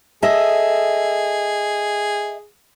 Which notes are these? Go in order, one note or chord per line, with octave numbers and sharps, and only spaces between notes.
G#4 A4 D#5 E5